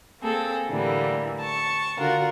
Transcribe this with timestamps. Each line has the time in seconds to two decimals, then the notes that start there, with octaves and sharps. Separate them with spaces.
0.20 A#3 C4 G#4 A4
0.68 A2 D3 E3 G3 A#3
1.39 A5 C#6
1.97 D3 F4 F#4 A#4 F#5